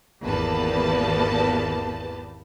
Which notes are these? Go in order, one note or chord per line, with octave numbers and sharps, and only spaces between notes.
G#1 E2 A#3 G4 B4 A5